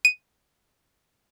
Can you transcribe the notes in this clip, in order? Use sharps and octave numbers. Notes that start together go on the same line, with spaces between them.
D#7